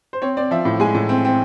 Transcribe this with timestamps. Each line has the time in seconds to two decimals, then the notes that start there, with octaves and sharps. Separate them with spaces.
0.13 C5
0.22 C4 C#5
0.37 C4 D5
0.51 F3 E5
0.65 A2
0.80 G#3 G#5
0.94 A2
1.09 C4
1.25 C4